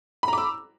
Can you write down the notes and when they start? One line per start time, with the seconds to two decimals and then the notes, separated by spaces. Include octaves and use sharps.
0.23 B5
0.28 A#5
0.33 D6
0.38 E6